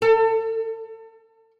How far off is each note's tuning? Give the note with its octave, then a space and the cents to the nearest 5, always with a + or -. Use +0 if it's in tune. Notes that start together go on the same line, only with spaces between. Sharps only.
A4 +35